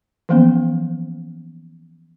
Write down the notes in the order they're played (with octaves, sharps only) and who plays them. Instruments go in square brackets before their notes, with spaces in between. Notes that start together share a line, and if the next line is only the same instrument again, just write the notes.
[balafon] E3 F3 A#3 B3 C#4 C5